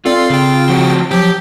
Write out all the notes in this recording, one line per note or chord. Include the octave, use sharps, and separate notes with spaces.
C4 F4 A4 D5
C#3 G5
F3 F#4
F3 F#3 G4